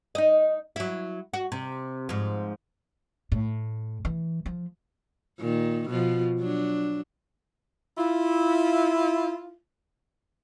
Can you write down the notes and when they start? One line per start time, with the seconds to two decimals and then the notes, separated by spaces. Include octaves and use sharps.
0.15 D#4 D#5
0.76 F#3 E4
1.33 F#4
1.52 C3
2.09 G#2 F3
3.32 A2
4.05 E3
4.46 F3
5.39 A#2 D#3
5.89 B2 F3 F4
6.39 F#3 D4
7.97 E4 F4